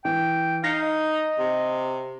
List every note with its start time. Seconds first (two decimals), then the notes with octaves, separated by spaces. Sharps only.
0.05 E3 G5
0.64 D#4 F5 A#6 C#7
0.82 D#5
1.39 C3